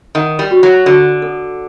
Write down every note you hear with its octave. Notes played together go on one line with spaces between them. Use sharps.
D#3 F#5
G3
F#4
F#3
D3 F#4
A4